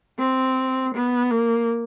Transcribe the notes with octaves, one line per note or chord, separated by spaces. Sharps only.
C4
B3
A#3